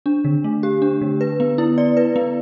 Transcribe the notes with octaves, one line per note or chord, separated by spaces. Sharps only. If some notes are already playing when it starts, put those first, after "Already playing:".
D4
D3
A3
G4
D4
D3
B4
B3
E4
D5
B4
B3